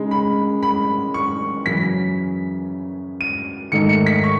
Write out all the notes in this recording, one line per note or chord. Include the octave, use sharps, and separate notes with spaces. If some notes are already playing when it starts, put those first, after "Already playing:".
Already playing: C#3 G#3 D#4
B5
B5
C#6
F#2 C#3 E3 B6
D#7
G#2 D#3 A3 D#4 C#7
C#7
B6
C#6